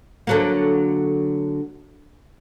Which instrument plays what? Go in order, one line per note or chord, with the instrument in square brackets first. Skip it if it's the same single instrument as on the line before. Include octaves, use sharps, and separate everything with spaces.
[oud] D3 F#3 A#3